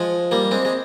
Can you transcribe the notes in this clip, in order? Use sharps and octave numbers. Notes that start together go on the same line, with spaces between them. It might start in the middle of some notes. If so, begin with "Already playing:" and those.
Already playing: F3 G#3
G3 A#3
G#3 C4
G#3